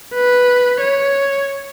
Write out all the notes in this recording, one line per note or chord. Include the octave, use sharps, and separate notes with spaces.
B4
C#5